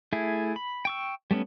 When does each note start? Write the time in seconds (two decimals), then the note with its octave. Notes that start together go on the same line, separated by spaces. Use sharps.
0.13 A3 E4 G#4
0.56 B5
0.85 G5 C#6 E6
1.31 G3 A3 B3 C#4